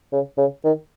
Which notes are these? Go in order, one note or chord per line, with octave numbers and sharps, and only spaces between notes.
C#3
C#3
D#3